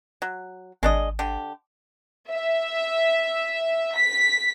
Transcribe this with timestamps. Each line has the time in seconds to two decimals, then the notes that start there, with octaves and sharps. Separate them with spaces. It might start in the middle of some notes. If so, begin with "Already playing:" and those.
0.22 F#3
0.83 G#1 G#3 D4 D#5
1.19 D3 G4
2.31 E5
3.95 B6